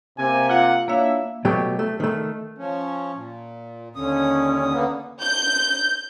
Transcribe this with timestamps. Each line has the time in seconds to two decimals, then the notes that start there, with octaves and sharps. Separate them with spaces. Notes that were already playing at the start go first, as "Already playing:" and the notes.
0.18 C3 A#3 G#5
0.49 F4 F5 F#5
0.88 A#3 D4 E4 C#5 E5 F5
1.45 B2 F#3 A3 G4
1.79 A3
2.00 D#3 A3
2.58 F3 C#4
3.15 A#2
3.95 D#2 D3 C#4 D#6
4.73 D3 A#3 B3
5.21 G6